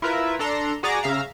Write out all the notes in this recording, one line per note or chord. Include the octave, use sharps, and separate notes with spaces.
E4 F4 A#4 B4 E5
D4 A4 A#5 C6
F#4 G#4 D5 A#5 D6
C#3 E5 F5 A#5